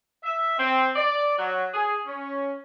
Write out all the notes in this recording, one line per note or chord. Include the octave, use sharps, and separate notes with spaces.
E5
C4
D5
F#3
G#4
C#4